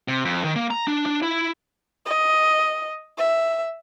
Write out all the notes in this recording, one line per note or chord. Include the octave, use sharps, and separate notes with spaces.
C3
F2
D#3
A#3
A#5
D4
D4
E4
D#5
E5